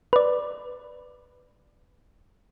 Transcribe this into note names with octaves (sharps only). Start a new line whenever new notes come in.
B4 D5